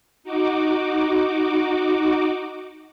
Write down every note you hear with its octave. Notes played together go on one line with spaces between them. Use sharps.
D#4 F#4 D6